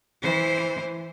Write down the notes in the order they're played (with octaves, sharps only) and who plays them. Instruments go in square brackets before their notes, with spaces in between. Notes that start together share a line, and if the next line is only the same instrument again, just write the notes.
[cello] E3 C5